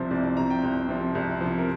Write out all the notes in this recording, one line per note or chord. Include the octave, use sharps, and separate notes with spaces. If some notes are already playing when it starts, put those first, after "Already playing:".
Already playing: C2 C3 F3 C5
C2 D5
D5
C3 F3 A#5
G5
C2
C3 F3
C2
C3 F3
A#4